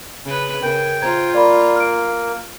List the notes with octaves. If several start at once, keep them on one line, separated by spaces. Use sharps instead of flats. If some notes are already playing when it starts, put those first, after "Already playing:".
C#3 B4
C#3 A#4 G5
F4 C5 A#5 G#6
A#3 D5 B5
F6 D7